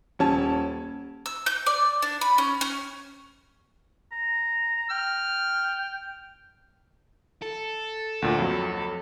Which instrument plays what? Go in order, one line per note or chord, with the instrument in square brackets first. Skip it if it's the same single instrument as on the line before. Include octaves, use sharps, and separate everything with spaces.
[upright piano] D#1 C#4 A5
[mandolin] E6
G6
D5
D4
B5
C#4
C#4
[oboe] A#5
[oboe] G5 [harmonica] F6
[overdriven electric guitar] A4
[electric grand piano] D2 A#2
F2 F#3